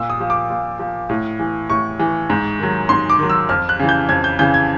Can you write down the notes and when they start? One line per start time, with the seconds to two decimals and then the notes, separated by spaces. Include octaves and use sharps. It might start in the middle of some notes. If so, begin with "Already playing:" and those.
Already playing: A#2 E6
0.10 D#6
0.20 F3
0.30 D6
0.50 A#2
0.79 F3
1.10 A2
1.39 E3
1.70 A2 C#6
1.99 E3
2.30 G#2
2.60 D#3 F#3
2.89 G#2 C6
3.10 D6
3.19 D#3 F#3
3.30 E6
3.49 F2 F6
3.69 F#6
3.79 C#3 E3
3.89 G6
4.09 F2 G#6
4.24 G6
4.39 C#3 E3 G6
4.54 G#6